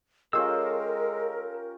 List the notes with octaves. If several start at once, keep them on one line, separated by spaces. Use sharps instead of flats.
G#3 C#4 F4 G4 A4 A#4 F5 E6